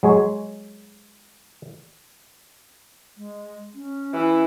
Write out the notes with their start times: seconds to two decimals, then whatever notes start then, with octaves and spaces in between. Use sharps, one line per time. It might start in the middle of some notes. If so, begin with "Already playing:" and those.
0.03 F#3 G#3 C#5
3.17 G#3
3.74 C#4
4.13 E3